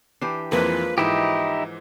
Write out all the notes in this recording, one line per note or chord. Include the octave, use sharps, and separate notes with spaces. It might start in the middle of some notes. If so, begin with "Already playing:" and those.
E3 D4 G4 G5 C7
F2 E3 F3 G#3 A#3 B4
G#2 E3 D#4 E4 G4 D#6